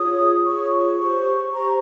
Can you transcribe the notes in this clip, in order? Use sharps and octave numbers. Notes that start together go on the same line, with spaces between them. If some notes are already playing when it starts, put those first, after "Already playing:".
Already playing: F4 G#4 C#5 D#6
F4 G#4 C#5 C#6
G4 C5
G4 C5 A#5